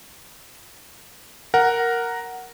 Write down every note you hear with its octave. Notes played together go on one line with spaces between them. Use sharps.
A#4 F#5